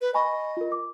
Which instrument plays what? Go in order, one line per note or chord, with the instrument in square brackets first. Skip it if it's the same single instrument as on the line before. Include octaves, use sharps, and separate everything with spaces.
[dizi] B4
[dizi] D#5 [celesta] G#5 B5 C#6
[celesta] F4 A#4
D6